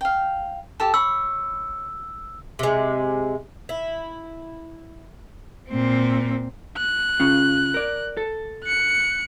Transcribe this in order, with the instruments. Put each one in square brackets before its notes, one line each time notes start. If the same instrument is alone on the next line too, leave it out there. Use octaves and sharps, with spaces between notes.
[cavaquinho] F5 G5
G4 A4 A5
[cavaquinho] C#5 B5 [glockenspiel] E6
[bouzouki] C3 G#3
E4
[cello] A#2 C4
[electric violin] F#6
[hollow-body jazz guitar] C#3 C#4 F4
A#4 D5
A4
[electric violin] F#6 C#7